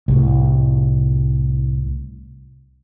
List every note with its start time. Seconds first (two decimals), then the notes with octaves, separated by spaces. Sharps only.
0.08 C2 A2